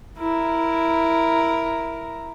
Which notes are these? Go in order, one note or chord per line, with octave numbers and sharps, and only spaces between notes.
E4 A#4